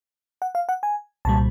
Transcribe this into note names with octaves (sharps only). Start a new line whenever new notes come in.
F#5
F5
F#5
G#5
C2 A#2 G3 A5